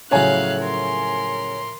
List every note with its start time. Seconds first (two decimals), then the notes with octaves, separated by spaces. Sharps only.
0.11 A2 C#3 F3 F#3 C#5 F5 G#5 F#6
0.62 A#4 C6